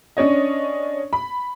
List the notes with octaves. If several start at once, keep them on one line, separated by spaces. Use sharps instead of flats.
C#4 D4 C#5 D#5
B5